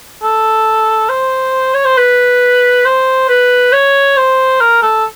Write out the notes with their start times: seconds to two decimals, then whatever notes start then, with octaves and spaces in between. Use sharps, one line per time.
0.23 A4
1.09 C5
1.74 C#5
1.85 C5
1.97 B4
2.85 C5
3.29 B4
3.73 C#5
4.17 C5
4.61 A#4
4.82 A4